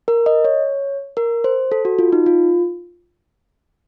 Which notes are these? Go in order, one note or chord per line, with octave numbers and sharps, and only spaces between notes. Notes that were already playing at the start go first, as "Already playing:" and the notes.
A#4
D#5
C#5
A#4
C5
A4
F#4
F4
D#4
F4